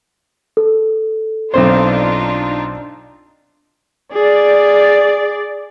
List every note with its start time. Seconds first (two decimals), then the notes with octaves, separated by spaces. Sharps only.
0.57 A4
1.54 B1 C4 D4 D#4 F4 C5
4.13 G#4 D5